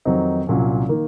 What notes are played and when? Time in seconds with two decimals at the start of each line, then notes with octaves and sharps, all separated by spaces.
0.05 F2 D#3 F#3 C4 D#4
0.47 C2 A#2 F#3 C#4
0.89 D#3 A#3